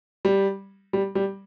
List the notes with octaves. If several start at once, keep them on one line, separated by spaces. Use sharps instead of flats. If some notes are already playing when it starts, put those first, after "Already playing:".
G3
G3
G3